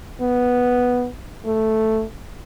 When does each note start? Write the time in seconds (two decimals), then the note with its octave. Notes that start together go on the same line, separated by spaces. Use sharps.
0.21 B3
1.46 A3